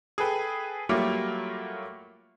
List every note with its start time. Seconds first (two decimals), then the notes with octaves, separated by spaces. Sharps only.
0.18 G#4 A4 B4 G5
0.89 F#3 G3 A3 A#3 F4 D6